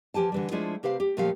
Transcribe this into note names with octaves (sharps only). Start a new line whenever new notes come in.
E3 F3 G4 G#5 A5
D3 E3 G3
F3 G#3 A3 D4 E4 F4
C3 G4 B4 C5 F5
G4
D2 A#2 F3 A3 G4 F5